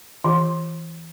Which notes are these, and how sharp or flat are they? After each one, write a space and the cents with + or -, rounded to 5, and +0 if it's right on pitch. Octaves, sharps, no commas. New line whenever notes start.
E3 +0 F4 +0